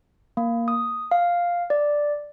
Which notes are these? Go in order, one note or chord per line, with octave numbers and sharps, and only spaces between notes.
A#3
D#6
F5
D5